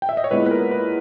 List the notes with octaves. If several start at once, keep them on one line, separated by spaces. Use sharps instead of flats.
G5
E5
D#5
C#5
A#2 G#3 B3 E4 B4
B4
A#4
B4